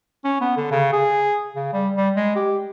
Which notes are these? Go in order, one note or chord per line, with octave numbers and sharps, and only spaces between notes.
C#4
B3
D3
C#3
G#4
C#3
G3
G3
G#3
G4